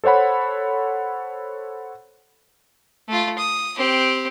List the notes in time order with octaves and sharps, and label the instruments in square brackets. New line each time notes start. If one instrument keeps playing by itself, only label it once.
[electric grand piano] A4 C5 C#5 F#5 B5
[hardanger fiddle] A3 F4
D#6
C4 G4